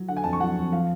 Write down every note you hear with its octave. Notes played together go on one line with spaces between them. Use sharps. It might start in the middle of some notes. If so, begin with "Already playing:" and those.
Already playing: F#3
D3 F#5
G#5
F2 A5
C#6
F#3 F#5
F2
F3 F5